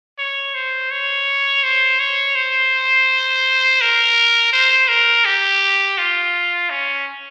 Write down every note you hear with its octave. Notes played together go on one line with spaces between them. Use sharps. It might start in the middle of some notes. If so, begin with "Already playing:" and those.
C#5
C5
C#5
C5
C#5
C5
A#4
C5
A#4
G4
F4
C#4